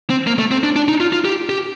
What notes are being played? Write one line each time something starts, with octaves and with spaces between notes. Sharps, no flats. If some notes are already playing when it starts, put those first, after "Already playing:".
C4
A#3
A3
C4
D4
D4
D#4
F4
F4
G4
G4